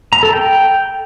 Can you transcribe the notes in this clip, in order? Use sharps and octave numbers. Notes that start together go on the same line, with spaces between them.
A#5
A4
G5